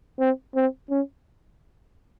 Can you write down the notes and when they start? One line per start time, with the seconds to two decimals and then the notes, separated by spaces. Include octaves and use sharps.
0.19 C4
0.55 C4
0.90 C#4